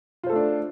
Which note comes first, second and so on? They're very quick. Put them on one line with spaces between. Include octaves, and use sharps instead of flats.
F4 C5 A4 A3 D4